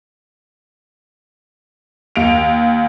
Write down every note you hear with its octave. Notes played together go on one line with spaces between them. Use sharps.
D#2 D7 F7